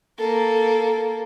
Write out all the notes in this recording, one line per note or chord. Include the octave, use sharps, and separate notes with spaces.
A#3 A4